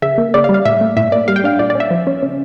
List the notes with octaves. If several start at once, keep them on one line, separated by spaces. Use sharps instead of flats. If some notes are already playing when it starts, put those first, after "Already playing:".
C#3 E5
A#3
C#3 D5
F5
G3
F5
A2 E5
A3
A2 E5
A#3 D5
G3 F5
G5
D4 F5
A#2 D5
D5
C#4
E5
F3
C#4
C#3